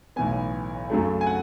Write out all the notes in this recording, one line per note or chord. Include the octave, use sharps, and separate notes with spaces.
B1 A2 E3 B3 G#5
F#2 C#3 F#3 A3
G#5
F#5